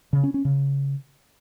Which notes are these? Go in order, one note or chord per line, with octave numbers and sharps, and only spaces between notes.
C#3
C#4
C#4
C#3